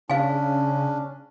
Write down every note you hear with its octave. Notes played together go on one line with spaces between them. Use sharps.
C#3 C#4 D4 F5 G#5